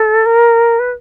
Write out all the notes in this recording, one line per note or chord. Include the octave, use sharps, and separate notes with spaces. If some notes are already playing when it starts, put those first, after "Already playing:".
Already playing: A4
A#4
B4